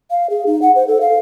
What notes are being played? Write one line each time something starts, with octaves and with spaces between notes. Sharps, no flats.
F5
G#4
D#4
F#5
C5
A4
F5